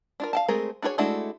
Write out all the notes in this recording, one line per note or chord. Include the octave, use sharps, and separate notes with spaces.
D4 F4 A#4
F5 G5 A5
G#3 A3 C4 G#4 A#4
D4 F#4 G#4 A#4 C#5
G#3 A3 D4 E4 F#4